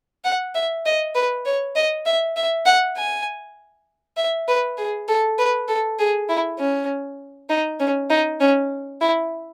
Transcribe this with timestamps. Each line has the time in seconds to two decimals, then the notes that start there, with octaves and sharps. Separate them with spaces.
0.24 F#5
0.55 E5
0.85 D#5
1.15 B4
1.46 C#5
1.76 D#5
2.06 E5
2.36 E5
2.66 F#5
2.97 G#5
4.17 E5
4.48 B4
4.78 G#4
5.08 A4
5.38 B4
5.68 A4
5.99 G#4
6.29 E4
6.59 C#4
7.50 D#4
7.80 C#4
8.10 D#4
8.40 C#4
9.01 E4